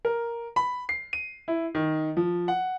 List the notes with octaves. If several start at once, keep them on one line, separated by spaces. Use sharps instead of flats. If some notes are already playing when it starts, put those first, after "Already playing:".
A#4
B5
C7
D#7
E4
D#3
F3
F#5